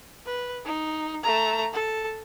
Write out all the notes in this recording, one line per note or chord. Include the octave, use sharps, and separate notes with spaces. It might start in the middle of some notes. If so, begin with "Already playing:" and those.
B4
D#4
A3 A#5
A4